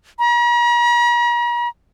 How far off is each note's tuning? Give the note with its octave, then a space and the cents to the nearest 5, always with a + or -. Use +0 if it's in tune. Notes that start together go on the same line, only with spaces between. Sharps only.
A#5 +45